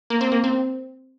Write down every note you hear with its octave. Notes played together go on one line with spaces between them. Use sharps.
A#3
C4
A#3
C4